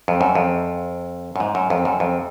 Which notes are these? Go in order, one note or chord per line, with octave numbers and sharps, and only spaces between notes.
F2
F#2
F2
F#2
G#2
F#2
F2
F#2
F2